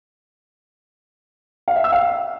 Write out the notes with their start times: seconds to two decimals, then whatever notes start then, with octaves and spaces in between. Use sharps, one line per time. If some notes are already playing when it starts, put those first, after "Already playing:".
1.68 F5
1.76 E5
1.84 E6
1.92 F5